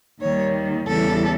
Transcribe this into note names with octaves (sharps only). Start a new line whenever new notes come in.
D#2 D#3 G3 C#5
E2 C#3 E3 G3 A4